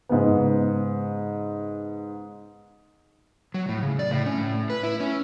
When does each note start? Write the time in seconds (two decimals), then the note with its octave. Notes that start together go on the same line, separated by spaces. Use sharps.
0.09 G#2 C#3 B3
3.54 F#3
3.69 A2
3.82 C#3
3.99 D5
4.11 A2
4.26 C#4
4.38 A2
4.70 B4
4.83 E4
5.00 C#4